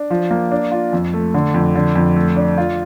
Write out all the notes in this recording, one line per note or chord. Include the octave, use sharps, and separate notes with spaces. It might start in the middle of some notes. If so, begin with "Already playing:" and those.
Already playing: D4
F3
A#3
D4
F4
F2
A3
D3
F2
D3
F2
A3
D4
F4